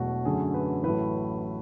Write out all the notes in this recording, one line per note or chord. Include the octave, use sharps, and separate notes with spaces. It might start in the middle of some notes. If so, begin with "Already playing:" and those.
Already playing: E1 E2 B2 F#3 A3 F#4
F#2 D3 F#3 A3 G#4
B4
A1 A2 F#3 A3 B4